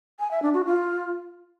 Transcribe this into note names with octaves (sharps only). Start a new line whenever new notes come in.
G#5
E5
D4
F#4
F4